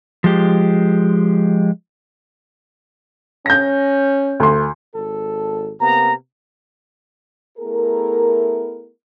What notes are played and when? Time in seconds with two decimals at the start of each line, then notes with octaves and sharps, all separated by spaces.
0.24 F3 G#3 G4
3.46 C#4 G6 A#6
4.40 D2 C6
4.95 G#1 A4
5.80 C3 A#3 B3 A#5
7.58 A3 B3 E4 G#4 A#4